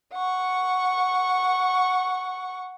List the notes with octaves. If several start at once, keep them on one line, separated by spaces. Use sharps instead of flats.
F#5 C#6